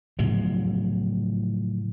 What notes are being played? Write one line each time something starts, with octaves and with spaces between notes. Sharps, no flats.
A2 C#3 F3 F#3